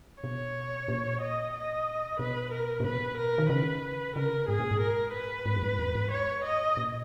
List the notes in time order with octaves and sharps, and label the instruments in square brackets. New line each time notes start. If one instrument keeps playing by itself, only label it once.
[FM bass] B2 [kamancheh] C#5
[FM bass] A#2
[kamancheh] D#5
D#5
[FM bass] B2 [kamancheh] B4
[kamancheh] A#4
[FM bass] A#2
[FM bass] B2 [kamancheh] B4
[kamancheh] A#4
[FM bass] D#3
[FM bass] C#3 [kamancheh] B4
[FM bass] C#3 [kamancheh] A#4
[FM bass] G#2 [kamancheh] G#4
[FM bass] A#2
G#2
[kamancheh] A#4
B4
[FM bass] G#2
F#2
G#2
E2
G#2
[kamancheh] C#5
D#5
[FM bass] A#2